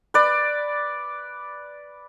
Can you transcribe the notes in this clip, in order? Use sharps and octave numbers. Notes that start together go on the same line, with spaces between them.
B4 D5